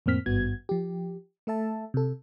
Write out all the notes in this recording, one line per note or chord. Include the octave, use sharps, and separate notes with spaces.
F2 A2 A#3 C4 F6 B6
G#1 G2 B3 F#4 G#6
F3 G4
A3 A4 E5 A5
C3 A4